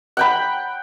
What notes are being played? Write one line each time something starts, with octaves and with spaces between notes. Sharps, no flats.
F#5 G5 B5